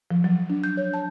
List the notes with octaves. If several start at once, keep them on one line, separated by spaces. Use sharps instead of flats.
F3
F#3
D4
G6
C#5
A5